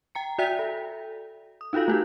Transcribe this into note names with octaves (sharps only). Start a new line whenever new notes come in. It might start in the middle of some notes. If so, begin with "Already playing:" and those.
G5 A#5 C#7
F#4 D5 E5 G5 B6
A4
D#6
D#4 F4 F#4 A4 F5
A3 F#4 G4